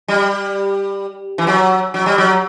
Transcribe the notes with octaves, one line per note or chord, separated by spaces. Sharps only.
G3
E3
F#3
F#3
G3
F#3